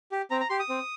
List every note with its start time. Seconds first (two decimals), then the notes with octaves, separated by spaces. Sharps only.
0.12 G4
0.31 C4 A#5
0.41 A#5
0.50 G4 C6
0.60 D#6
0.69 C4